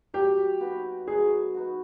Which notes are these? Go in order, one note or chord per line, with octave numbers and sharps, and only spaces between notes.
F#3 G4
B3 D#4 F#4
F#3 G#4
B3 D#4 F#4